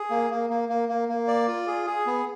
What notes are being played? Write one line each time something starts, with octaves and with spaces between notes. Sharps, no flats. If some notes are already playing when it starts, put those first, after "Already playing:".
Already playing: G#4
A#3
A#3
A#3
A#3
A#3
A#3
D5
F4
G#4
G#4
B3